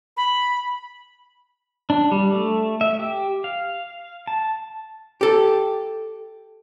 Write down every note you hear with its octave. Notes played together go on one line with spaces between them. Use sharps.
B5
D4
G3
A3
E5
G4
F5
A5
G4 A4